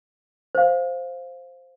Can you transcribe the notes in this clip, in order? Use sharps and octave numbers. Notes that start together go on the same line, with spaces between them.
C5 F5